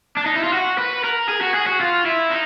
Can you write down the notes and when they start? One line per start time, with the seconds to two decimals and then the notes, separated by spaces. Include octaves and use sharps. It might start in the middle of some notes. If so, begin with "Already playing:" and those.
0.17 D4
0.26 D#4
0.35 E4
0.44 F4
0.53 F#4
0.79 B4
1.04 A#4
1.29 G#4
1.41 F#4
1.54 G#4
1.67 F#4
1.81 F4
2.06 E4
2.30 D#4